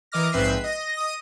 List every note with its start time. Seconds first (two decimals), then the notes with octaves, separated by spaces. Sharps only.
0.12 E3 A#4 D#5 D6 F6 A#6
0.32 A#1 G#2 C4 B4 E5 C7
0.64 D#5 A#6
0.97 D#5 D#6